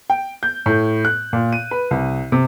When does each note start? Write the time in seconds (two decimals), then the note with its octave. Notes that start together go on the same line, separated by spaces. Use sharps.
0.10 G5
0.43 G6
0.66 A2
1.05 F#6
1.33 A#2
1.53 D#7
1.71 B4
1.91 C2
2.32 C3